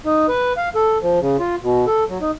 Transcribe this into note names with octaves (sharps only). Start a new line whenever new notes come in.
D#4
B4
F5
A4
F3
C#3
F4
B2
A4
F#3
D#4